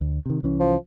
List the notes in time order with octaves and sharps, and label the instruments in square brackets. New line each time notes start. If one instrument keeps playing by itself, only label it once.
[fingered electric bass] D2
C3 D#3
C2 E3 C#4
[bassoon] F3